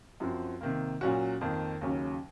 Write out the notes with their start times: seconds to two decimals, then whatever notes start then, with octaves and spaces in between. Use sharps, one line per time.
0.20 F#2 F3 C4 F#4
0.61 C3 D#3 A#3
1.01 A#2 F#3 C#4 F#4
1.41 F2 D#3 A#3
1.81 D#2 C#3 F#3 C#4